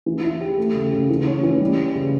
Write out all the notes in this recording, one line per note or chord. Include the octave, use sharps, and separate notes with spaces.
E3
E4
G4
A3
C#3
C#3
E3
C#4
E3
G3
C#4
C#3